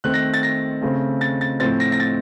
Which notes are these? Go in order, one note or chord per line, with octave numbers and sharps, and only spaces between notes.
D#3 A3 C4 F#6
A#6
A6
A#6
C#3 A3 C4
A6
A6
A2 F3 A3 C4 A6
A#6
A#6
A6